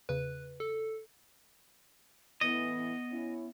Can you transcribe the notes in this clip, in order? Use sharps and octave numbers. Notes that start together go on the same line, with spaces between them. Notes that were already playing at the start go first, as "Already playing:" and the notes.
E2 C#3 B4
A4
A2 E3 B3 D#5
C#4 E4